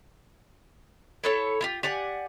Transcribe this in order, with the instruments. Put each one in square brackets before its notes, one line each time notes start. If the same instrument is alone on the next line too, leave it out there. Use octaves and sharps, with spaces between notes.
[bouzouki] E4 A4 C#5
E4 F4 G4
G4 D5 F#5 G#5